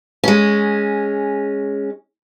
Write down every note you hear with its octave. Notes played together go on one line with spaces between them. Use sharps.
G#3 C#4